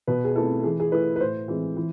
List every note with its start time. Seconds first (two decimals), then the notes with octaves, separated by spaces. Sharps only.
0.07 B2 B4
0.25 G#4
0.35 A3 C4 E4 A4
0.64 E3 G#4
0.80 G#4
0.92 A3 E4 B4
1.16 B4
1.20 A2 C5
1.48 E3 G#3 C4
1.77 E3